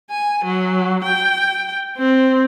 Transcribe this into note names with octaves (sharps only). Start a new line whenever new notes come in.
G#5
F#3
G5
C4